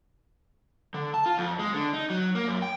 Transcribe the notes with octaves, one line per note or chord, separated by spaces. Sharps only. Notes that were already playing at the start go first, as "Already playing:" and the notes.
D3
A5
F4
F2
G#3
D3
D#4
F#3
A#3
F#2
G5